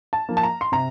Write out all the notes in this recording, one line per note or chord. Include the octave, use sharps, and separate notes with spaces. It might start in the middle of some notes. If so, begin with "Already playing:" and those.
A5
F3 A#3
A5
A#5
C6
C3 A#5